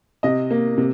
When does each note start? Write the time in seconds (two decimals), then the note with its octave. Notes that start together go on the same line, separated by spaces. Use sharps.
0.23 C3 D#5
0.51 A#3
0.78 C3